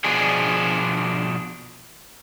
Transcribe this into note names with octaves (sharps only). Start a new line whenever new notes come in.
B2 F3 D4 G#4